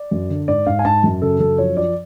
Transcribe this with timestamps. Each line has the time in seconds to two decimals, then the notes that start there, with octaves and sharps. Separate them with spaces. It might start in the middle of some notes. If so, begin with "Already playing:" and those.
Already playing: D5
0.11 F#2
0.30 D3
0.48 G#2 D5
0.67 G#2 F5
0.79 G#5
0.85 G#2 A5
1.04 F#2
1.22 C#3 A4
1.40 F#2 A4
1.58 F3 C#5
1.76 F3 D5